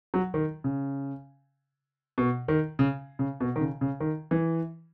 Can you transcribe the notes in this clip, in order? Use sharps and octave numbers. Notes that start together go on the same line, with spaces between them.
F#3
D#3
C#3
B2
D#3
C#3
C#3
B2
D#3
C#3
C#3
D#3
E3